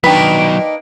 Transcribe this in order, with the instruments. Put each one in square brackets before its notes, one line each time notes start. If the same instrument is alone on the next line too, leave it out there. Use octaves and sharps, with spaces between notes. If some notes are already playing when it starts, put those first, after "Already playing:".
[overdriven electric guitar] D#3 F#3 [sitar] A#3 D4 D#4 [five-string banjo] B4 [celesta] G5 B6